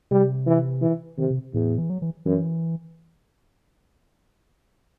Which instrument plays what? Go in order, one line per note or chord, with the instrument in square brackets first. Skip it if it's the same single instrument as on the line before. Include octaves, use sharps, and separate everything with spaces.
[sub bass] C3 [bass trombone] G3
[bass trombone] E3
E3
[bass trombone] C3 [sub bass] D#3
[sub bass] C3
[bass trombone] E2 [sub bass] A2
[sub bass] E3
F#3
E3
[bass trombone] F#2 [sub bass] E3